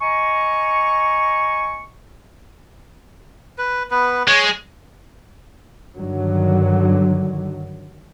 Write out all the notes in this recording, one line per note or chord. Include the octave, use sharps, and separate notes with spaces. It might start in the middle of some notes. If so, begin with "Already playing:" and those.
D#5 G#5 A#5 C#6
B4
B3 B4
G#3 C#5
G2 D3 D#3 F#3